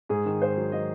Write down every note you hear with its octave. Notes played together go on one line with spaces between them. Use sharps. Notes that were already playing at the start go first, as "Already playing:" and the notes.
G#2 G#4
D#3
G#2 C5
F#3
F#3 D#5